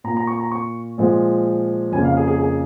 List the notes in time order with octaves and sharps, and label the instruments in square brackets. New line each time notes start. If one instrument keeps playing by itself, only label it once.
[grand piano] A#2 A#5
A#3
A#5
C#6
A#5
C#6
A#2 F3 G#3
F2 C#3 A#3 G#5
F5
G#4
G#4
G#4